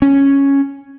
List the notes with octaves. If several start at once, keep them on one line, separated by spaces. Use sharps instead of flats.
C#4